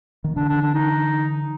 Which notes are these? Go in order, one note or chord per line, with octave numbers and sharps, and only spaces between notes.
D#3
D3 E3 D4
D4
D4
D#4